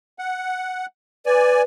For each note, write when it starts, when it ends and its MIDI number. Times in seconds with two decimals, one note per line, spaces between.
0.19 0.86 78
1.26 1.64 71
1.26 1.62 74
1.26 1.62 80